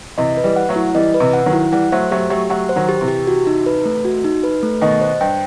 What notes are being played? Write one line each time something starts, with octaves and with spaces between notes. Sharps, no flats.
C3 E3 D#5
B4
E3 G3
F#5
F#3 A3
E4
E3 G3 D#5
B4
C3 E3
F#5
D#3 F#3
E4
E3 G3 F#5
F#3 A3 C5
F#3 A3 G4
F#3 A3 G4
F#3 A3 F#5
C5
D#3 F#3
G4
C3 E3
G4
F#4
D#4
B4
A3
F#4
D#4
B4
A3
B2 D#3 D#5
C5
G2 G5